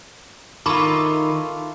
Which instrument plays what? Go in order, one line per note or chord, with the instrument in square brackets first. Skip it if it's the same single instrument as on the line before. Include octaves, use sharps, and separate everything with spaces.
[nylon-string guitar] D#3 [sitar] E4 F4 A4 [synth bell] B5 C#6 D6